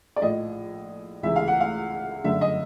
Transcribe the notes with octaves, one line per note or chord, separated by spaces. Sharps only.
D5
A#1 A2 F3 D#5
C#2 C3 E3 G#3 E5
F5
F#5
F5
G1 F#2 D3 E5
D#5